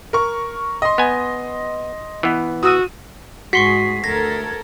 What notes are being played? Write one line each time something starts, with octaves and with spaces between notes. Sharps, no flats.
A#4 C#6
D#5 C6
B3 G#5
E3 B3
F#4 D#6 E6 D#7
G#2 F#4 G#4 F#5 C6 C#6 B6 C7
D2 A4 A#4 G#6 A#6